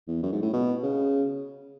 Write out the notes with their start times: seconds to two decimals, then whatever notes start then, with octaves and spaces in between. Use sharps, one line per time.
0.08 E2
0.22 F#2
0.32 G#2
0.42 A2
0.53 B2
0.83 C#3